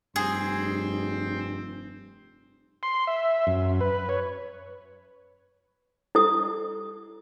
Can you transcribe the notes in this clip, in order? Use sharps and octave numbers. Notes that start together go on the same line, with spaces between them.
F1 G2 C4 G#4 C5
C6
E5
F#2
B4
C#5
E4 A4 D#6